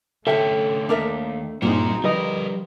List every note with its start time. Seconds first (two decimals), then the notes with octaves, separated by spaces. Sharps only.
0.27 D3 A3 C#4 A4 C5 E5 F5 G5
0.89 D#2 D4 A#4 E5
1.62 G2 A#2 C4 D#4 F4 F#4 G#4 A#4
2.04 D3 F3 G3 A#4 B4 D#5